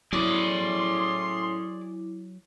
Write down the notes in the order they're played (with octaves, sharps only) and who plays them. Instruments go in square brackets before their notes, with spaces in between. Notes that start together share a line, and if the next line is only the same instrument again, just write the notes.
[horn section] A2 C#4 C6 [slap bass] F#3 [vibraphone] E4 [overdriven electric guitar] G#4 D5